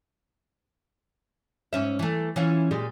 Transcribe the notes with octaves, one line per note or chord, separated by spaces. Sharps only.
G#2 C#4 E5
E3 A3
E3 C#4 F4
A#2 G3 G#3